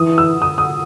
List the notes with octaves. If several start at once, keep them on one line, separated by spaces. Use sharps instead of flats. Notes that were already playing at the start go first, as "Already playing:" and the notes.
Already playing: E3 D#6
E6
D#6
D#6